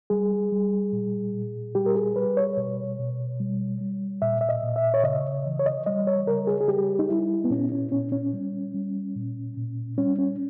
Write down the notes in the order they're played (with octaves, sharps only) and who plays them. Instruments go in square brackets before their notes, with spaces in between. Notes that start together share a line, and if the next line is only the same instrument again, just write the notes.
[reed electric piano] G3 G#4
G3
A#2
A#2
G3 G4
A#4
G#4
G3 B4
C#5
B2
B2
G3
G3
A#2 E5
E5
D#5
A#2
E5
C#5
C#3 D#5
E3
C#5
D#5
G3 D#5
C#5
C#3 A#4
G#4
G#4
G3 G4
D#4
G3 E4
B3
A#2 C#4
C#4
A#2 C#4
C#4
G3
G3
A#2
A#2
G3 C#4
C#4